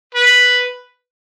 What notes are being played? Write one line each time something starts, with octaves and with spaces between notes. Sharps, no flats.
B4